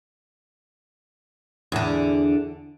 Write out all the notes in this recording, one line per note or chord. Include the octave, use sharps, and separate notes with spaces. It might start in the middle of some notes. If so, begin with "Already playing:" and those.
E2 D3